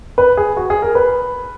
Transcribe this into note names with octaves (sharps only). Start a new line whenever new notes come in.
B4
G#4
F#4
G#4
A#4
B4